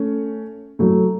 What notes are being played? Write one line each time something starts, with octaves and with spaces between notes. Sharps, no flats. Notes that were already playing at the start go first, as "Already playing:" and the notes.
Already playing: A3 C#4
F#3 A3